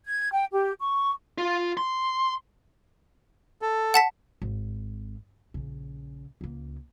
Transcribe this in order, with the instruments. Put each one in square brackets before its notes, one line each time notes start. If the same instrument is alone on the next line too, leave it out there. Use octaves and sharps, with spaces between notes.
[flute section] G#6
G5
G4
C#6
[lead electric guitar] F4
C6
[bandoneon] A4
[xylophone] F#5 A5 B6
[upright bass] G#1
A#1 C#3
C#2 A#3